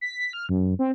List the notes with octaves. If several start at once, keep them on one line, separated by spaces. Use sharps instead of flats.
B6
F6
F#2
C4